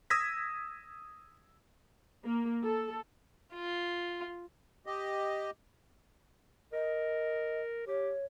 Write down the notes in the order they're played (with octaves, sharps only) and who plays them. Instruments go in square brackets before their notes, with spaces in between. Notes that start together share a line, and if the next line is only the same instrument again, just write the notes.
[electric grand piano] D#6 E6 G#6 A#6 B6
[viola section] A#3
A4
[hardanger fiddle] F4
[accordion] G4 D#5
[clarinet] A#4 [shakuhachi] D#5
[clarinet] G4 [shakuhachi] C#5